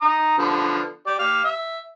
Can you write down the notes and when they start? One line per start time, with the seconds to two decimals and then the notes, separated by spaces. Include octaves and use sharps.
0.02 A#5 D#6
0.38 D3 F3 B3
1.07 G4 D5
1.19 G4 F5
1.44 E5